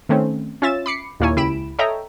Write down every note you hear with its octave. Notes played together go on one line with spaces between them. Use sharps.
D#3 A3 C4 C#4
C#4 F4 E5 A6 E7
B5 D6 C7 C#7
D#2 A#2 A#3 E4 C#5 G#5
C#2 E4 G4 B5 D7 E7
A4 C#5 D#5 E5 G5 A#5